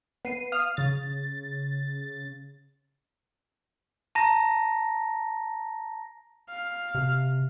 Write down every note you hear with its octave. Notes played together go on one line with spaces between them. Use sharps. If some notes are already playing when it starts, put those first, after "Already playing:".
B3 C7 D#7
F5 D#6 F6
C#3 A6
A5 A#5 A#6
F5
C3